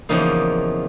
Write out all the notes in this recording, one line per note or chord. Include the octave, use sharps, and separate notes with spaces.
E2 C#3 F3 A#3 D#4